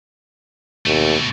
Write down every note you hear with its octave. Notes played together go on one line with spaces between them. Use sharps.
D#2 B2 A3